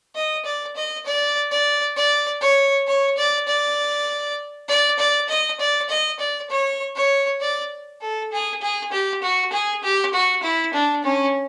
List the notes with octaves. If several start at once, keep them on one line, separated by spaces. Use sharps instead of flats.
D#5
D5
D#5
D5
D5
D5
C#5
C#5
D5
D5
D5
D5
D#5
D5
D#5
D5
C#5
C#5
D5
A4
G#4
G#4
G4
F#4
G#4
G4
F#4
E4
D4
C#4